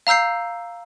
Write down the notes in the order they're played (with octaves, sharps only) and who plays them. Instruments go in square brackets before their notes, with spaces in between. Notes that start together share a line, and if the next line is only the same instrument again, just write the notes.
[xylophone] F5 A#5 E6 G6 C7